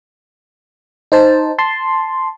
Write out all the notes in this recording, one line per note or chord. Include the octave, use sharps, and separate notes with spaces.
D#4 C5 A5
A5 C6